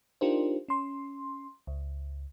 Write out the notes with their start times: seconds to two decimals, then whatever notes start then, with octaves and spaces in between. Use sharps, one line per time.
0.21 D4 D#4 F4 G4 A#4 C5
0.68 C#4 C6
1.67 C#2